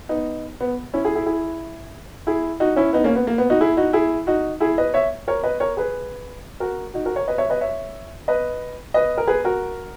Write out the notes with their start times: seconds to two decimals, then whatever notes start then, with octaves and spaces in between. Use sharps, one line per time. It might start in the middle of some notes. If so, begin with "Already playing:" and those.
0.09 B3 D#4
0.61 B3
0.94 C#4 E4
1.05 E4 G#4
1.15 E4 G#4
1.26 E4 G#4
2.27 E4 G#4
2.60 D#4 F#4
2.76 C#4 E4
2.93 B3 D#4
3.04 A#3 C#4
3.16 B3
3.27 A#3
3.38 B3
3.50 D#4 F#4
3.61 E4 G#4
3.77 D#4 F#4
3.93 E4 G#4
4.27 D#4 F#4
4.60 E4 G#4
4.78 B4 D#5
4.94 C#5 E5
5.28 A#4 C#5
5.44 B4 D#5
5.60 A#4 C#5
5.77 G#4 B4
6.60 F#4 A#4
6.94 D#4 F#4
7.05 F#4 A#4
7.16 A#4 C#5
7.28 B4 D#5
7.38 C#5 E5
7.50 B4 D#5
7.61 C#5 E5
8.28 B4 D#5
8.94 B4 D#5
9.18 A#4
9.27 G#4 B4
9.44 F#4 A#4